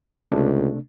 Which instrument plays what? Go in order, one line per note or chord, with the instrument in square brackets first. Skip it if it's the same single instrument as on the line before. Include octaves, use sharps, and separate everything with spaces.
[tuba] C#2 [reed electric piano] C3 A3 D4